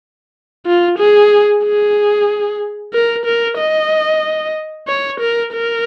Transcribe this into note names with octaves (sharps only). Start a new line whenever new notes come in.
F4
G#4
G#4
A#4
A#4
D#5
C#5
A#4
A#4